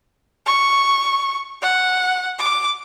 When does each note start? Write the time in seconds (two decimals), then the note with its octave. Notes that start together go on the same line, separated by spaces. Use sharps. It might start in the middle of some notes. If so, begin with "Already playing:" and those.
0.46 C#6
1.62 F#5
2.39 D6